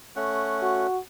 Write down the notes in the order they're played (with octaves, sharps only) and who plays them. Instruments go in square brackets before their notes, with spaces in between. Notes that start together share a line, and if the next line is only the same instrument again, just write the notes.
[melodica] A3 C#4 F#5
[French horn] F#4